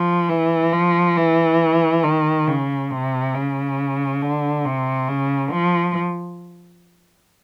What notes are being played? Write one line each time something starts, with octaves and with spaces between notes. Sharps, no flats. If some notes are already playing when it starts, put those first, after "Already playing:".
Already playing: F3
E3
F3
E3
D#3
C#3
C3
C#3
D3
C3
C#3
F3